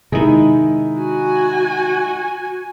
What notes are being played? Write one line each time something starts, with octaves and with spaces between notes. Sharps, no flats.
C3 D#3 G#3 D#4 E4
F#4 G#5